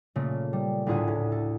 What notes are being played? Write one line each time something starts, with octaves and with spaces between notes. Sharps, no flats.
A#2 C#3 A3 A#3
G3
D2 A2 F4 G#4 E5 F#5
A2
A4